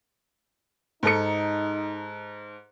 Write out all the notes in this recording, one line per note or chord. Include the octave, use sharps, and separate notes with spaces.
G#2 D#4 A4 C#7